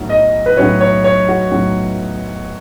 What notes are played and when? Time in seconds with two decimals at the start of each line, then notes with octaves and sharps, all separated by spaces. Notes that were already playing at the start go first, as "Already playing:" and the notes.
Already playing: B1 A2 F#3
0.09 D#5
0.46 B4
0.57 B1 A2 F#3 C#5
0.81 C#5
1.04 C#5
1.29 F#4
1.52 B1 A2 F#3